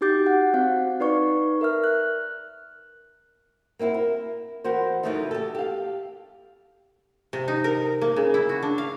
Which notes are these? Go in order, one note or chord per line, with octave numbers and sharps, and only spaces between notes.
D#4 F#4 G4 D6 G6 A6
F#5
C4 F#4 F5 F#5
D#4 B4 D5 C#6
A#4 E5 F6
F#6
A#3 C4 E4 F#4
A#4
E3 F#4 A#4 C5
F#2 C#3 E3 F3 A3 D#4
G4 A4
G4 F5
C3
D#4
A#4
A#3
C#3
E4
F#4
D4
F5